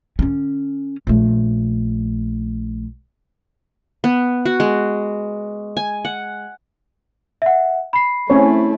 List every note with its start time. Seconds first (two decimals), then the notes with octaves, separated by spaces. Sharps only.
0.19 D3 C#4
1.07 A#1 A3
4.04 B3
4.45 F#4
4.60 G#3
5.77 G#5
6.05 F#5
7.42 E5 F#5
7.93 B5 C7
8.30 A3 C4 C#4 E4 C#5